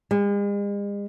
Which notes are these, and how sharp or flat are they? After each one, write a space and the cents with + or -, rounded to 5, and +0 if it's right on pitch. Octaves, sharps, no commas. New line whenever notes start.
G#3 -45